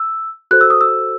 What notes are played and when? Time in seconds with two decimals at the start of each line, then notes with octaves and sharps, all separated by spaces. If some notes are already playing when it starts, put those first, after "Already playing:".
Already playing: E6
0.51 F#4 A4 C5 F#6
0.61 E6
0.70 D#6
0.81 E6